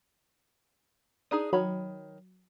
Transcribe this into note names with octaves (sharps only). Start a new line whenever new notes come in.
D4 D#4 G#4 D#6
D#3 F#3 C#5 B5